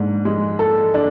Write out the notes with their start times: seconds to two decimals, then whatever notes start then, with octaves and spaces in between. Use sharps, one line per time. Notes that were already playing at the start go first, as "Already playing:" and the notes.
Already playing: G#2 D4
0.25 G#3
0.59 A4
0.94 D4